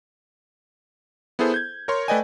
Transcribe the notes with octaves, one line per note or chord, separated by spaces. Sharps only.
B3 E4 G#4 A4 C5
G6 G#6
A#4 C#5 C6
A3 B4 D5 D#5 G5 G#5